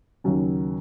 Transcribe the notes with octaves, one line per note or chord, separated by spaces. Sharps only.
D#2 C#3 F#3 C#4